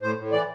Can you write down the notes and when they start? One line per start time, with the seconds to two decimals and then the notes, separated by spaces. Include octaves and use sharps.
0.02 A2 C5
0.17 A2
0.32 E3 D5